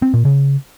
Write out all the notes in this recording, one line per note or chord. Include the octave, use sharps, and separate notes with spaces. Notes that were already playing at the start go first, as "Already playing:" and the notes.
C4
A#2
C#3